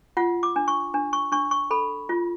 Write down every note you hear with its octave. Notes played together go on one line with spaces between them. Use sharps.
F4 F#5
D6
D4
C#6
D4
C#6
D4 C#6
C#6
A4 B5
F4